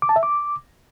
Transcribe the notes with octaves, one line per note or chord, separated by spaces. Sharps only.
D6
A5
E5
D6